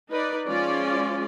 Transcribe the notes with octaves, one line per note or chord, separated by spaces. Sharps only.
D#4 B4 D5
F3 G#3 C#4 F4 D5